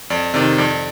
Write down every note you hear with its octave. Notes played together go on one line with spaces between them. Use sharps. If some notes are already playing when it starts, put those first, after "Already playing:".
F2 D5
C3 D#3 D5
F2 D5